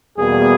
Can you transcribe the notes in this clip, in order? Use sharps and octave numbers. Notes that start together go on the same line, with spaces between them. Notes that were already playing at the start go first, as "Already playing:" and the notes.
E2 B2 G3 A#3 G#4